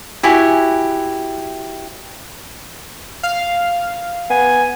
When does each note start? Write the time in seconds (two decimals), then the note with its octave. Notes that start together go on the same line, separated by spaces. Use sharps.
0.23 E4 F#4 G4 G#5
3.23 F5
4.30 B3 G#5